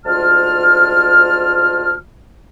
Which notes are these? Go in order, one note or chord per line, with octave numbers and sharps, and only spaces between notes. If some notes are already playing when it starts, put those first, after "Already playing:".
D2 G#2 F4 A5 F6